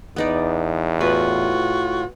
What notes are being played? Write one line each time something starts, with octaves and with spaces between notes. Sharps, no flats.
E2 B3 D#4 D5
A2 F4 F#4 B4